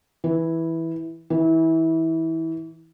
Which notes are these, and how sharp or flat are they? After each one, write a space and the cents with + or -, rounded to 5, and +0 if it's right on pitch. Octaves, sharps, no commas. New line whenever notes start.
E3 -10
E3 -25